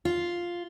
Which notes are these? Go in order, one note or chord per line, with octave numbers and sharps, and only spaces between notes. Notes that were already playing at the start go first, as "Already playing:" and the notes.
F4